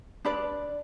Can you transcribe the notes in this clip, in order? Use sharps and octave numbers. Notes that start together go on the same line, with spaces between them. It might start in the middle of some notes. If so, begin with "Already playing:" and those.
D4 B4 D5